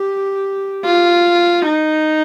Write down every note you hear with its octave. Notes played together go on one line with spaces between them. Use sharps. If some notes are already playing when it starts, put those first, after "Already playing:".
Already playing: G4
F4
D#4